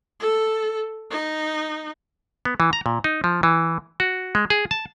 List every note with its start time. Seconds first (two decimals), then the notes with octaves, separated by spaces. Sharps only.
0.20 A4
1.10 D#4
2.45 B3
2.60 E3
2.73 A#5
2.86 A#2
3.04 D#4
3.24 F3
3.43 E3
4.00 F#4
4.35 G#3
4.50 G#4
4.71 A5